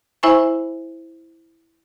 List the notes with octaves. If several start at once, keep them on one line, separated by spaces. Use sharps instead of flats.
E4 C5 E5 G#5 B5 C#6